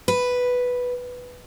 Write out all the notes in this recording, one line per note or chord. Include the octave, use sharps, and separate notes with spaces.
B4